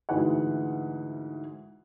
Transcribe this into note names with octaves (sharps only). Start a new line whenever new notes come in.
D2 G#2 E3 G#3 B4 F#5